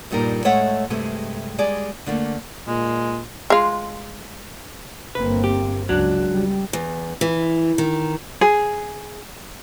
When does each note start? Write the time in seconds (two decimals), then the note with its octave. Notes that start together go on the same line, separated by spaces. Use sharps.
0.11 G2 A#2 G3 D#4 A#4
0.44 A2 G#3 A3 C#5 E5 F#5
0.90 G2 C3 G#3 A3
1.58 G3 G#3 G#4 D5
2.06 D3 A3 A#3
2.67 A#2 G#3
3.50 G#3 F4
5.15 G1 A#3 C4 B4
5.44 G4
5.89 C#2 F#3 D4
6.31 G3
6.73 E2
7.21 E3
7.78 D#3
8.41 G#4